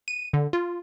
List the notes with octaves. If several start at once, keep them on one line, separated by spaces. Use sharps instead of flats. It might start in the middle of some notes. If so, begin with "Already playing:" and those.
D#7
D3
F4